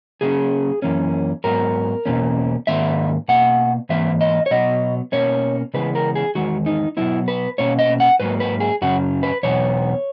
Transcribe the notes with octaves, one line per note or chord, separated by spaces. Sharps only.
C#3 F#3 A#3 C#4 G#4
F#2 E3 A#3 C#4
G#2 F#3 B3 A#4
E2 B2 A#3 C#4
G#2 D#3 A#3 E5
B2 A#3 F#5
G#2 E3 A#3 E5
D#5
C#5
B2 F#3 B3 D#5
B2 A#3 C#4 C#5
C#3 E3 G#3 B3 B4
A#4
G#4
E2 D#3 G#3 F#4
D#4
B2 F#3 B3 E4
B4
B2 A#3 C#4 C#5
D#5
F#5
G#2 F#3 A#3 B4
B4
G#4
F#2 C#3 F#3 F#4
B4
E2 B2 F#3 B3 C#5